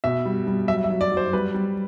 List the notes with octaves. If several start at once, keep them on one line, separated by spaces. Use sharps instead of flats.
B2 E5
G3
G3
F#3 E5
E5
F#3
D5
F#3
C5
G3 B4
G3